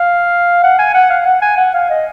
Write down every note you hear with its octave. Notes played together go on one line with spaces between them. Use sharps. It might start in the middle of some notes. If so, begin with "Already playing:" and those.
Already playing: F5
F#5
G#5
F#5
F5
F#5
G#5
F#5
F5
D#5